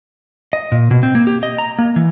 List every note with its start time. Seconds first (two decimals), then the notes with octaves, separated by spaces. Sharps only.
0.53 D#5
0.72 A#2
0.91 B2
1.03 C4
1.15 A#3
1.27 G4
1.43 D#5
1.58 A#5
1.79 A#3
1.96 E3